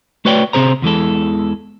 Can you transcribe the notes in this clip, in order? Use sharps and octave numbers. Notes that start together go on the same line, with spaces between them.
A3 F#4 B4 C#5 D5 G5
C3 C4 G#4 C5 A#5
E2 E3 G#3 A4